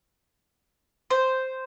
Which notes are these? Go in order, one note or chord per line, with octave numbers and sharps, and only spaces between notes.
C5